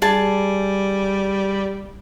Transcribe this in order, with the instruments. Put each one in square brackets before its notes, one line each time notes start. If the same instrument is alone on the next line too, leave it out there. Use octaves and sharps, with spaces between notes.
[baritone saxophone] G3 [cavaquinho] G#4 A5